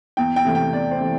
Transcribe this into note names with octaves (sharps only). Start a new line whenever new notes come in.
E2 G5
G5
C3 E3 A3
G5
E2 D5
C5
C3 E3 A3